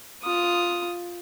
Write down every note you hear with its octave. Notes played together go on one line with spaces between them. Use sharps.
F4 D#6